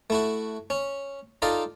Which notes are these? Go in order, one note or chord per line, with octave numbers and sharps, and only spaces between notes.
A3 E4 F#4
C#4
D#4 F4 A4 D5 D#5 F5